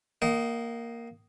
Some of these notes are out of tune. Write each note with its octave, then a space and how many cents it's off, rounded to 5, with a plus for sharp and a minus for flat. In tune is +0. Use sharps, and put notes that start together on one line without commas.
A#3 +0 D#5 +0 G5 -40